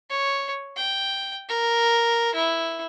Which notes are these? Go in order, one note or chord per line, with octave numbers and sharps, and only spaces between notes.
C#5
G5
A#4
E4